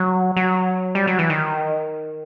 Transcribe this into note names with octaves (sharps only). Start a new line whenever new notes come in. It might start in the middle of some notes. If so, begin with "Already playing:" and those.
Already playing: F#3
F#3
G3
F#3
E3
D#3